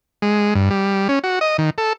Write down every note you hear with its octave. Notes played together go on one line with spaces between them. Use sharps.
G#3
G2
G3
C#4
F#4
D#5
D#3
A4